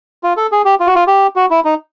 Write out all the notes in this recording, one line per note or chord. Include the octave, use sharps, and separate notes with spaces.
F4
A4
G#4
G4
F4
F#4
F4
G4
F#4
E4
D#4